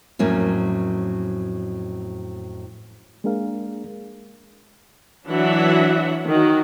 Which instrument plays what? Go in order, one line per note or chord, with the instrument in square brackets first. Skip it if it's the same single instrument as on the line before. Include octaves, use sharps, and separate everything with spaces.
[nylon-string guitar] F2 A2 F#3 A#3 C#4
[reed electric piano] G#3 A#3 D4 G#4 A#4 F5
[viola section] E3 F#3 D4 E5 F#5
D#3 F#4